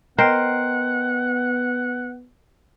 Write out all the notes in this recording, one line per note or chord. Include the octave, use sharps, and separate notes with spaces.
B3 A#4 C5 D#5 F#5 G5 D7